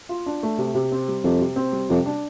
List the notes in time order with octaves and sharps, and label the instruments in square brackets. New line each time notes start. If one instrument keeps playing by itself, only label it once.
[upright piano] F4
D4
A3
C3
C3
C4
G3
[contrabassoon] F2 [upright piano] C3
[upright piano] C3
C4
G3
[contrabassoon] F2 [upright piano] C3
[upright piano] D4